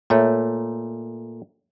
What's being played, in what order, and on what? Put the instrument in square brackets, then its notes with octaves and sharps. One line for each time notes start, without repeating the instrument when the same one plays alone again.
[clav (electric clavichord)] A#2 A3 [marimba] C#5 E5